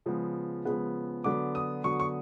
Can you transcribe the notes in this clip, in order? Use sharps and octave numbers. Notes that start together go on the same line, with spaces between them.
C#3 F3 G#3 B3
C#3 F3 G#3 B3
D3 F#3 B3 D6
D#6
D3 F#3 B3 C#6
C#6